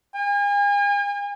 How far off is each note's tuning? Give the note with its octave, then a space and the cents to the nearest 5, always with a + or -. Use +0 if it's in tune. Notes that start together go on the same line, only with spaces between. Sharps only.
G#5 -40